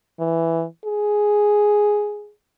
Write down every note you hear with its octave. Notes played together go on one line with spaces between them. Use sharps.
E3
G#4